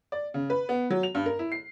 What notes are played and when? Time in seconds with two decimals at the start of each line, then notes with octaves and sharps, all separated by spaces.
0.12 D5
0.34 C#3
0.50 B4
0.69 B3
0.90 F#3
1.03 F7
1.15 G2
1.26 A#4
1.39 E4
1.52 C7